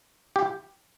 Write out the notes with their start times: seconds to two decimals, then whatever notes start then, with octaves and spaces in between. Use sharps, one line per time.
0.36 G4